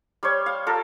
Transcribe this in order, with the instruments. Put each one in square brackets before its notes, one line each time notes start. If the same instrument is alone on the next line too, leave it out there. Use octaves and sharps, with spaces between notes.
[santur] G3 C5 C#5
F5
F4 A4 A#4